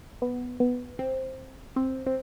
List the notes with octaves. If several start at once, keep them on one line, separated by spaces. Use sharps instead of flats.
B3
B3
C4
C4
C4